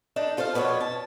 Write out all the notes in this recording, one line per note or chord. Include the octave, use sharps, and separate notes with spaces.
D4 D#4 A4
F4 A4 C5 D5 F5
F2 B2 B3 D4 C#5
A5